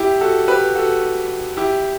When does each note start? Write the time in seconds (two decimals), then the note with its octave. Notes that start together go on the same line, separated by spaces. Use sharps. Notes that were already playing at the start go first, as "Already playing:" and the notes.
Already playing: E4 G4
0.21 F#4 A4
0.48 G4 B4
0.75 F#4 A4
1.57 E4 G4